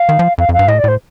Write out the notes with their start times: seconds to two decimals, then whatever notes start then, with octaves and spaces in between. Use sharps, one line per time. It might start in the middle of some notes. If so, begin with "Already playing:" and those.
Already playing: F5
0.09 D#3
0.19 F3
0.38 F2 F5
0.49 F2
0.53 F5
0.59 G2
0.68 A2 D#5
0.79 D5
0.84 A2 C5